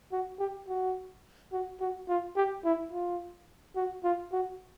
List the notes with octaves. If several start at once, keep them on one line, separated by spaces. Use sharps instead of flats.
F#4
G4
F#4
F#4
F#4
F4
G4
E4
F4
F#4
F4
F#4